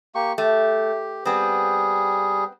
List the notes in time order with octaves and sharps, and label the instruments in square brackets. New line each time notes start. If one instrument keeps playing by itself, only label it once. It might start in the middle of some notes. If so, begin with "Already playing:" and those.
[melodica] A#3 G4 C#6
[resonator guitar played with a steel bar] A3 [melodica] G4
[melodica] G3 G#4 [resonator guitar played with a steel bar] B3 C4